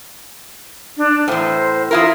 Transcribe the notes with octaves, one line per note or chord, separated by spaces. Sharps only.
D4
E2 A2 C5
E2 E4 F4 A#4